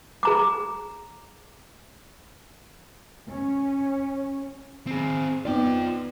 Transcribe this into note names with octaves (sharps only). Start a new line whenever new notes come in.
G#4 A#5 D6
C#4
C4 G#4
B3 D#4 F4 D5 G5